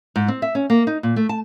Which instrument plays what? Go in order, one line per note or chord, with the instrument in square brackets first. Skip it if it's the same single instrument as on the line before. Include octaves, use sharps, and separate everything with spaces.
[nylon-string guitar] G#2
C4
E5
C#4
A#3
D#4
A#2
A3
A5